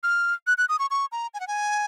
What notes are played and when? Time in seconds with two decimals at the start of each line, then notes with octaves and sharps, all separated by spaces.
0.03 F6
0.47 F#6
0.58 F#6
0.69 D#6
0.79 C#6
0.91 C#6
1.12 A#5
1.34 G#5
1.40 F#5
1.47 G#5